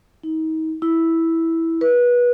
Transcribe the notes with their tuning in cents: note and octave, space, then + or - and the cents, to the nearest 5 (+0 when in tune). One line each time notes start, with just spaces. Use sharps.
D#4 +35
E4 -5
B4 -25